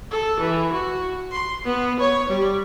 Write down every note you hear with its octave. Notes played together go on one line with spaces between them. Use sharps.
A4
E3
F#4
C6
B3
C#5
G3